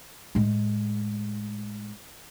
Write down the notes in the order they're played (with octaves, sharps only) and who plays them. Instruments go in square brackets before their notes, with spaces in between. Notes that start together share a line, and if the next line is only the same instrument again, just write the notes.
[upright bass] A2 G#3